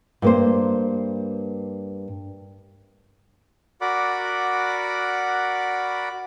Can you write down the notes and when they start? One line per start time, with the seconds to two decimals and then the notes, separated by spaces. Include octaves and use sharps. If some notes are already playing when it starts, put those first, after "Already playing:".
0.22 G2 A#3 C5
3.81 F#4 A#4 D5 F#5 B5 D6